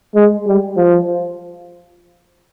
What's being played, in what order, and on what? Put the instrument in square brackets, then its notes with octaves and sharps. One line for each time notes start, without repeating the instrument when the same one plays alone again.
[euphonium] G#3
G3
F3